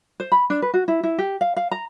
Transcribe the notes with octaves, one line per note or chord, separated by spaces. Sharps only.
C5
B5
D4
B4
F#4
E4
E4
G4
F5
F5
A#5